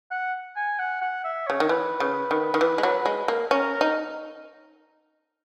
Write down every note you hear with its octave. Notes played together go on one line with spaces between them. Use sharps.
F#5
G#5
F#5
F#5
E5
C#3 C#5
D#3
E3 B4
C#3
D#3
D#3
E3
G#3
F#3
G#3
A#3
C#4 A#4
A#4
D#4